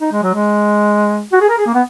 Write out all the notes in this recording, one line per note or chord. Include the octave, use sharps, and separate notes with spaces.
D#4
G#3
F#3
G#3
F#4
G#4
A#4
G#4
A#3
B3